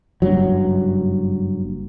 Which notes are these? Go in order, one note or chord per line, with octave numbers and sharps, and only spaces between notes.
F#1 G2 F#3